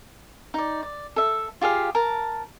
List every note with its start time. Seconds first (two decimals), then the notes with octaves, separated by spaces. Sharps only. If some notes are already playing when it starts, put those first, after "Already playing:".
0.54 D#4 D5
0.83 D5
1.16 A4 E5
1.61 F4 G4 G#4 F5
1.95 A#4 A5